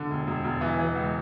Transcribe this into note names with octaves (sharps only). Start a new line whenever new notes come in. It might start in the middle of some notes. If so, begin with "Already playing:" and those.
Already playing: D3
E1
E1
E1
E3
E3
C#2